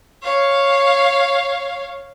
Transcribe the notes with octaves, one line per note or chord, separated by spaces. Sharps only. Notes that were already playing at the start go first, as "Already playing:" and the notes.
C#5 F5